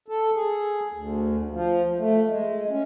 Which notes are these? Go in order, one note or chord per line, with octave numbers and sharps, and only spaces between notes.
A4
G#4
D2
F3
A3
G#3
C#4